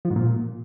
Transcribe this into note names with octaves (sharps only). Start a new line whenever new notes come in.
F3
G#2
A#2